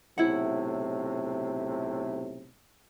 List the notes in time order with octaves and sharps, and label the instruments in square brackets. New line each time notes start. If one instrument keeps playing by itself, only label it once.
[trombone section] B1 A2 C3 [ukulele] E4 F#5